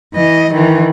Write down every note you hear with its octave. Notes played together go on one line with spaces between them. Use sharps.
E3 D#5
D#3 E3